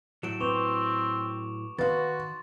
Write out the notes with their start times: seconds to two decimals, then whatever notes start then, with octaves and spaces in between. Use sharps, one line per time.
0.23 A2 F#3 D7 E7
0.40 C4 B4 C#6 D6 F7
1.79 D#3 F#4 B4 F5 C6 A6